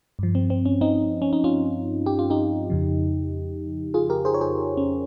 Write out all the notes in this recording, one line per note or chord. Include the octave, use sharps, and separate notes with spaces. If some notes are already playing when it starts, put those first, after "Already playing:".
G2 F3
C4
C4
C#4
C4 D#4
C#4
D#4
C#4 F4
G4
F4
D#4 G4
F2 C#3 F3
F4 G#4
G4 A#4
G#4 C5
C#5
G#4 C5
C#4